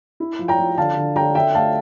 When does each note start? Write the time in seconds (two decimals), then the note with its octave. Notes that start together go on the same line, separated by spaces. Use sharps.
0.20 E4
0.39 F3
0.48 G5 A#5
0.58 F3
0.78 D3 F5 A5
0.97 D3
1.16 D3 G5 A#5
1.35 D3 E5 G5
1.55 A3 F5 A5